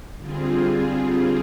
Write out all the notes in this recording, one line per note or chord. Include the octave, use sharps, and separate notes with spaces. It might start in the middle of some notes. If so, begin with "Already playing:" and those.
D3 G3 C4 F4 G#4